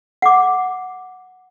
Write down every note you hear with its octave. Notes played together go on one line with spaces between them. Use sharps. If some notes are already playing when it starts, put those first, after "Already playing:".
F#5 D6